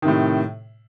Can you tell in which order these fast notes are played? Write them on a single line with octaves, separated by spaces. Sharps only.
D#3 C3 A2